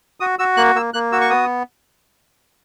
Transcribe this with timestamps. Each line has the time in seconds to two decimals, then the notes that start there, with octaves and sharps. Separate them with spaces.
0.20 F#4 D#6
0.39 F#4 E6
0.57 A#3 F#6
0.75 A#3 E6
0.94 A#3 F#6
1.12 F#4 E6
1.21 C#6
1.30 B3 D#6